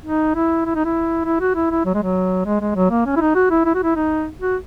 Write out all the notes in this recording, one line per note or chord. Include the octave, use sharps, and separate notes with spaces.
D#4
E4
E4
D#4
E4
E4
F#4
E4
E4
F#3
G#3
F#3
G#3
G#3
F#3
A#3
C#4
E4
D#4
F#4
E4
E4
F#4
E4
D#4
F#4